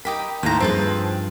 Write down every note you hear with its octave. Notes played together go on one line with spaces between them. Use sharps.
D#4 G4 A#4 B5
D#2 A2 C5 A#5
G2 F3 C4 D#4 G#4 A4 B4 C5